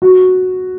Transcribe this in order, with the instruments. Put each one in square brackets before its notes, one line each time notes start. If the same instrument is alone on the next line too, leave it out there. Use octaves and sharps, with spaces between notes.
[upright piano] F#4